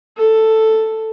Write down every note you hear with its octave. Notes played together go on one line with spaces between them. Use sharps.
A4